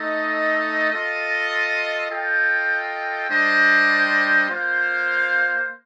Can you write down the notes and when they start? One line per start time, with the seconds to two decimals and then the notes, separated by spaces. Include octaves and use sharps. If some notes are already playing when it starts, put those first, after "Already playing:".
Already playing: A3 D#4 A4 D#5
0.91 F4 A4 D#5
2.10 F4 A4 D#5 G5
3.29 G3 D4 G4 C5 D#5
4.48 A#3 F4 C5 F5